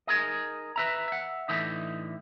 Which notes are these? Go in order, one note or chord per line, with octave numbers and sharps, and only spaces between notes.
D#4 G#4 A#4 D#5
B4 E5 A#5
E5 F#5
A2 D3 E3 D#4 E5